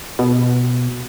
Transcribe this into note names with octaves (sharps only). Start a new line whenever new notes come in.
B2